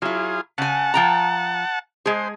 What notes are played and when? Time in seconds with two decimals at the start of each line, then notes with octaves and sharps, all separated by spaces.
0.02 F#3 E4 F4 G#4
0.58 C#3 F#5 G#5 A5
0.94 F3 G5 A#5
2.06 G#3 G#4 C5